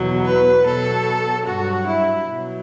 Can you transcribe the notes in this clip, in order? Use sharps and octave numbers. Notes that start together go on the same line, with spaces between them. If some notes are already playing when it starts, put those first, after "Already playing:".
Already playing: E2 B2 F#3
B4
B2 F#3 A4
G2 F#3 F#4
E4
B2 F#3